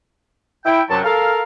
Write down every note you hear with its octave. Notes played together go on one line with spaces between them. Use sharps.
E4 G5
F#2 C3 F#3 A5
A4 A#4 F5